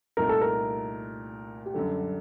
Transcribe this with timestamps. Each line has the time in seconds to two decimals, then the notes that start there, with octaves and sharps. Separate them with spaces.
0.17 C2 A#2 A3 D#4 A#4
0.29 A4
0.41 A#4
1.66 G4
1.74 F#2 D3 G3 A4